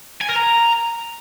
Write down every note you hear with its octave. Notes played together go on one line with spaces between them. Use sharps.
G#5
A#4
A#5